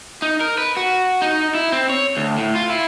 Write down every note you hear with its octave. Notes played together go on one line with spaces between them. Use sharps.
D#4
A#4
B4
F#4
D#4
E4
C4
C#5
D2
A2
F4
E4